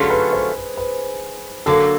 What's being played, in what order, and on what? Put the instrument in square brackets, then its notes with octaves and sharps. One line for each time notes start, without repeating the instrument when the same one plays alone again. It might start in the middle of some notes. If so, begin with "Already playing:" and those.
Already playing: [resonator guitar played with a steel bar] D3 F#3 A3 C#4 F4 [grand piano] G#4
[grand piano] B4
C5
B4
B4
[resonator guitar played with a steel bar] D3 F#3 A#3 [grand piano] A4